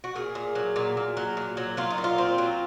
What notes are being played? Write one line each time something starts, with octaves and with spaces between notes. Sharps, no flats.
F#4
A#2 G#4
A#2
F#3
A#2
A#2
F#3
A#2
F#3
F#3 F4
D#4
A#2
F4
C4
F#3